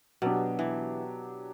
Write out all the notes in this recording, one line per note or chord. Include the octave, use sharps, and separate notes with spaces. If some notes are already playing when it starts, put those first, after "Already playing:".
B2 F#3 B3 D4 G4
E3